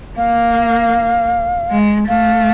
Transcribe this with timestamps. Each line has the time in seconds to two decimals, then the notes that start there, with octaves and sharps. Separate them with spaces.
0.17 A#3 F5
1.71 G#3
2.08 A3 F5